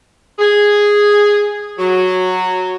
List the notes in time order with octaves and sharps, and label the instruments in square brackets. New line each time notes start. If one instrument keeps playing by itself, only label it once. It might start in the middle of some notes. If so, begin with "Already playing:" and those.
[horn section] G#4
F#3